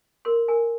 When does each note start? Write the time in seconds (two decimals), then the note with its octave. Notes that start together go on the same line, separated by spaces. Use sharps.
0.25 A#4 C6
0.48 A#4 G#5